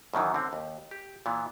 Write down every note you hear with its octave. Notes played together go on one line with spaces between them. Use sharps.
F#2 B2 D#3 E3
D3 C4
D#2
G4
A#2 E3 B3